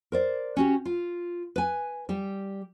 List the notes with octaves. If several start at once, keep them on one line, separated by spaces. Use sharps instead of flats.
A#4 C5 D5
C#4 F#4 G4
F4
B4 G#5
G3 G4